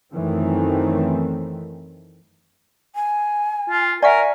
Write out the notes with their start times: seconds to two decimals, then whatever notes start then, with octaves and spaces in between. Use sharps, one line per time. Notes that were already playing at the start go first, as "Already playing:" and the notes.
0.13 F#2 D#3 E3 A3 C4
2.95 G#5
3.70 F4
4.02 A#4 D5 E5 F#5 G#5 C#6 B6